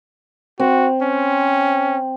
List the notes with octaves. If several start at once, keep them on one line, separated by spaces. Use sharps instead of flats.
C4 F#4
C#4